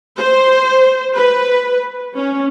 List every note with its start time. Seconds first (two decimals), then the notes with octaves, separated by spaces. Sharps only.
0.17 C5
1.15 B4
2.16 C#4